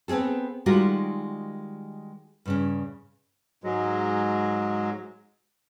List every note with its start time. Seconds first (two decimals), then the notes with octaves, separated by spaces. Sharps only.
0.08 B3 C4 D4 G#4 A4
0.66 D#3 G3 G#3 F4 F#4 A#4
2.46 G2 C#3 C#4
3.64 G#2 F#3 G#3